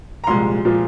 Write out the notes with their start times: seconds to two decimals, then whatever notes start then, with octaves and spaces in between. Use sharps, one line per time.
0.24 A#5
0.27 C2 A#2 F3 G#3 C6
0.65 A#2 F3 G#3